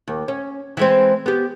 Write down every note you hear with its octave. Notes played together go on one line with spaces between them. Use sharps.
D#2
C#4
E3 G#3 C4
B3 G4